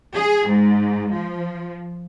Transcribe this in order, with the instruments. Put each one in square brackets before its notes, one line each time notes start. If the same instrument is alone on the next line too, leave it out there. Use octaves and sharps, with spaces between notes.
[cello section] G#4
G#2
F3